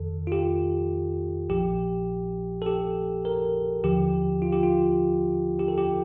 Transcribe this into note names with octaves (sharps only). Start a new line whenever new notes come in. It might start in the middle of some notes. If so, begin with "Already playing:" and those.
Already playing: F2 D#3 A4
F4
G4
A#1 A#2 F3 G4
A4
G4
A#4
D#2 D3 F3 G4
F4
G4
F4
G4
A4
G4